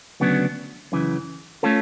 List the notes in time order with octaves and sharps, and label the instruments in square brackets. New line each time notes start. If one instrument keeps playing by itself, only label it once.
[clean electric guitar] D2 C#3 F#3 B3 D4
F#2 C#3 E3
A3 C#4 F4 A4